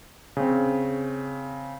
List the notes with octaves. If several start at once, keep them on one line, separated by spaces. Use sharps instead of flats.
C#3 C4